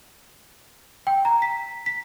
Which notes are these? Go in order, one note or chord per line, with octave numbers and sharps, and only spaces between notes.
G5
A#5
B6
B6